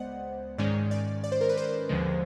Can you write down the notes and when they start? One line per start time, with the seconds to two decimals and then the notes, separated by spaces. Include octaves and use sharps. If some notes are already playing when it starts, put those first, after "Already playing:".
Already playing: C#2 G#3 B3 C5 D5 D#5 F#5
0.58 G#2 D#3 G#3 C#4 D5
0.91 D5
1.24 D5
1.32 C5
1.41 A#4
1.49 B4
1.57 C5
1.89 D#2 D3 F3 G#3